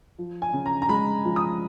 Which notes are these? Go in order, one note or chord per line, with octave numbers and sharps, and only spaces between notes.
F3
G#5
C#3
A#5
A#5
G#3 B5
F3
D#6